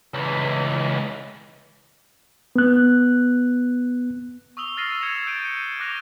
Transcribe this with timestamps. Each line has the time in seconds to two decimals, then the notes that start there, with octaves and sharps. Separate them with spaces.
0.14 C#2 E3
2.56 B3 F#6
4.57 C#6 D#6 E6 F7 G7
4.77 E6 F6 A6 A#6 C7 D#7
5.01 E6 G#6 C#7 E7 F7
5.27 G6 A6 D7 D#7
5.45 G6 C#7 D#7
5.79 D6 F#6 A#6 D#7 F7 G7